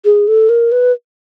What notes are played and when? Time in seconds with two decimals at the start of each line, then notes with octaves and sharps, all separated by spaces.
0.05 G#4
0.28 A4
0.49 A#4
0.72 B4